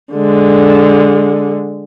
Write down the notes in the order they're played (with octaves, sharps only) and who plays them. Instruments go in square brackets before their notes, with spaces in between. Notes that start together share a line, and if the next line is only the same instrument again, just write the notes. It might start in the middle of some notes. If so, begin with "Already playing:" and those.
[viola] D3 G#3